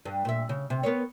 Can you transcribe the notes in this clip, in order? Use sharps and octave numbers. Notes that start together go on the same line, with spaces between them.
G2
A#2 E5
C#3
C3
B3 A#4 C#5